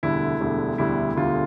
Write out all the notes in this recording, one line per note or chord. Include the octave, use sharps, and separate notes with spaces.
E1 D2 D3 G3 E4
E1 D2 D3 G3
E1 D2 D3 G3 E4
E1 D2 D3 G3 F4